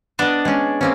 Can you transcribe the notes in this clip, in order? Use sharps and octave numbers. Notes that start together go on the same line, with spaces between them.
B3 D4 D#5
G#3 C#4
A#3 C4 C#4